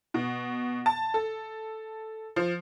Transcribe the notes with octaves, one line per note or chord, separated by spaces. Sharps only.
B2
A5
A4
F3